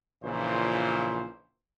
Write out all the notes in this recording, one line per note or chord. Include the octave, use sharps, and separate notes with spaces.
A#1 A#2 C#3 E3 C5